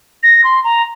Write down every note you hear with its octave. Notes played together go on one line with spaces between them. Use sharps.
A#6
C6
A#5